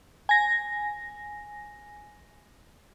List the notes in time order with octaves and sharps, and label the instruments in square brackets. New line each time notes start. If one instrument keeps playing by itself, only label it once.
[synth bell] G#5 A#6